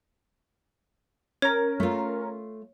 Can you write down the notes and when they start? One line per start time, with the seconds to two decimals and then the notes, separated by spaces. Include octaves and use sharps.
1.42 C#4 A#4 C#5
1.80 A3 F4